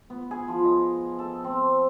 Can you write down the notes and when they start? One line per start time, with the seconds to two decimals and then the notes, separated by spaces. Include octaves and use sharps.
0.10 B3
0.31 G#4
0.48 F3
0.65 D#5
1.19 A4
1.44 C4